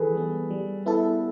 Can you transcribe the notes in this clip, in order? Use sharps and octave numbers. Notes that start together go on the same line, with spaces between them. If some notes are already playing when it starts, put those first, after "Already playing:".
Already playing: E3 G#4 A4 B4
G3 B3
G3
B3 E4 A4